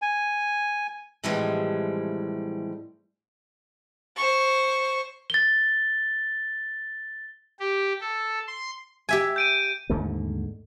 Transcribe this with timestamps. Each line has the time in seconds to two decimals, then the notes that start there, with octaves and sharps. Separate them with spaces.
0.02 G#5
1.24 A2 C3 E3 F3 G3 G#3
4.16 C5 C#6
5.30 A6 G7
7.60 G4
8.01 A4
8.48 C6
9.09 G4 E5 G#5
9.36 G6 D7 D#7
9.90 D#2 G#2 D3 A3